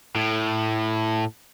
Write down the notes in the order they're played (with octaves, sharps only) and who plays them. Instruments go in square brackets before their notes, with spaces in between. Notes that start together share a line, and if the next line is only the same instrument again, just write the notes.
[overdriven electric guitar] A2